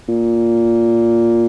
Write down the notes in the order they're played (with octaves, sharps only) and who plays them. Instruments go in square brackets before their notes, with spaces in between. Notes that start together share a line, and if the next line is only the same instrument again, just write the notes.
[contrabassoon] A#2